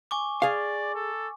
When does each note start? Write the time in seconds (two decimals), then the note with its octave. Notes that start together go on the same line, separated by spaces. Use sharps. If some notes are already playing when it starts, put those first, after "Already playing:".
0.11 G#5 C#6 D6
0.42 G#4 D5 F5
0.95 A4